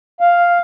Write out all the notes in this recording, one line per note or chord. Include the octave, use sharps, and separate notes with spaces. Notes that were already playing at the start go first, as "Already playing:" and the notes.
F5